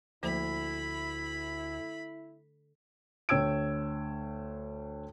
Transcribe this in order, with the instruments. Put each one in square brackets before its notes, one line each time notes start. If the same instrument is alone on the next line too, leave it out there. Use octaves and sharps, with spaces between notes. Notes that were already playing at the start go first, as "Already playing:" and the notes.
[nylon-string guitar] D2 [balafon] F3 A#3 C5 [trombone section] E4 [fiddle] B5
[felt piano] D2 C#5 G5 E6 G#6 D7